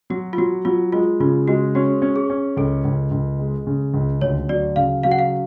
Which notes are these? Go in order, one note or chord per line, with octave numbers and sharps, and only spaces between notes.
F#3 F#4
F4
F#3 F#4
F#3 F4
G#3 F4
C#3 F4
G#3 F#4
C#4 F#4
C#4
G#4
C#4
C#2 A4
C#2
C#2
G#3
C#3
C#2
D2 C#5
F#3 D5
C#3 F5
F#3 F5
F#5
F5